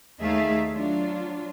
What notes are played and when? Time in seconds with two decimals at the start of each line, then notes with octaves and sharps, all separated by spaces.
0.20 D#2 A3 D#4 G#4 E5 F5
0.72 F#3 D4 F4